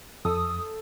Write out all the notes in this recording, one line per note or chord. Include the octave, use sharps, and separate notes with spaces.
F2 A4 D#6 E6